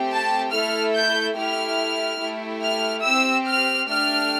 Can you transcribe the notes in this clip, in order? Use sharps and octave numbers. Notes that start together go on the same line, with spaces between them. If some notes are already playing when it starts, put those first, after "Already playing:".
Already playing: A3 C4 G4
A5
A3 E4 A4 F6
G6
A3 E4 G4 F6
A3 E4 G4
F6
C4 G4 E6
F6
A3 D4 G4 F6